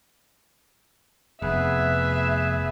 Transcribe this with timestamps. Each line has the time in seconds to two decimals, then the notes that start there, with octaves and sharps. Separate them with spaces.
1.42 F1 B3 G#4 B4 E5